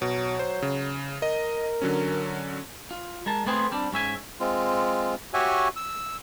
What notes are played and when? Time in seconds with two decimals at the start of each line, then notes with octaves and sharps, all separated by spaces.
0.02 B2 F#3
0.39 C5
0.62 C#3
1.22 A#4 D#5
1.82 D3 F#3 C#4
2.91 F4
3.26 G#3 A#4 A5
3.46 A3 B3 C4 G#4 B4 C5
3.72 G3 C4 D4
3.93 G#2 C#4 E5 G#5
4.40 G#3 C4 F4
5.34 F#4 G4 C#5 E5 F#5 G#5
5.76 E6